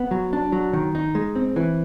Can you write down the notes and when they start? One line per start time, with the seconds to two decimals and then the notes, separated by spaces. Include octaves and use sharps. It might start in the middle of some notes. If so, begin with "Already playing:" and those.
Already playing: B3
0.11 F#3
0.33 D4
0.52 F#3
0.73 D#3
0.95 D#4
1.15 G#3
1.35 C4
1.56 E3